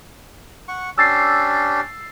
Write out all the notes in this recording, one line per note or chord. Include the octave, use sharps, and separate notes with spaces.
F#5 C#6
C#4 D4 G4 E6 A6 C7